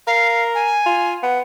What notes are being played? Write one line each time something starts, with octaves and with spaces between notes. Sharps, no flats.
A#4 F5
G#5
F4
B3